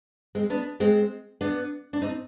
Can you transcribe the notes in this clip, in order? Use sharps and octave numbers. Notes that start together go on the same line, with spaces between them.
G#3 C4
B3 D4
G#3 C4
B3 D4
D4
C4 D#4